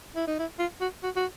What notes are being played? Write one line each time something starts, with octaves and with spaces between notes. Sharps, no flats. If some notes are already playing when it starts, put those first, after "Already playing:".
E4
D#4
E4
F4
F#4
F#4
F#4